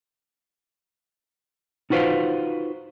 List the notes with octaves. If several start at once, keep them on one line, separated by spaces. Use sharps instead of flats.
D#4 F4 F#4 B4 C5 F5